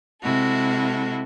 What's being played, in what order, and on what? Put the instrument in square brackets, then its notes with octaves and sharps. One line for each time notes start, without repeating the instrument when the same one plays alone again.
[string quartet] C3 G#3 E4 F#4 A4